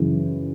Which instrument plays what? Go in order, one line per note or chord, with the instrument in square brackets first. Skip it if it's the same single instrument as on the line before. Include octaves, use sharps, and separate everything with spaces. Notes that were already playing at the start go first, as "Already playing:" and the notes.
Already playing: [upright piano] F#2 C#3 E3